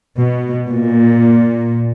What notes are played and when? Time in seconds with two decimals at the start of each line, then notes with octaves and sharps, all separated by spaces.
0.19 B2
0.69 A#2